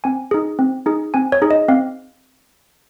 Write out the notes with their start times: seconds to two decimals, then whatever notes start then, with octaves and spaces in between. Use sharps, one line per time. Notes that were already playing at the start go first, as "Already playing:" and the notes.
0.04 C4 G#5
0.31 D#4 G#4
0.59 C4
0.86 D#4 G#4
1.14 C4 G#5
1.32 C#5
1.42 D#4 G#4
1.51 D#5
1.68 C4 F5